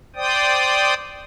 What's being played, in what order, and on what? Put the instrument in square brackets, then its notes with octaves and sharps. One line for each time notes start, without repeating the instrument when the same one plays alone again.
[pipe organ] C5 D5 G5 D#6